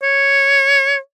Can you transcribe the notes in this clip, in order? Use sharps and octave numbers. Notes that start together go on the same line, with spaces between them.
C#5